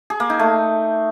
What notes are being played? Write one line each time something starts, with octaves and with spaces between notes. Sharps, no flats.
G#4
A#3
D#4
A3